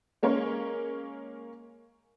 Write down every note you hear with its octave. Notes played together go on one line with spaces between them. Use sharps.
G#3 A#3 C#4 A#4 C#5